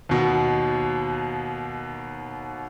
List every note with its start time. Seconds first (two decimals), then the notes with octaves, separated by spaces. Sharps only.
0.09 D#2 B2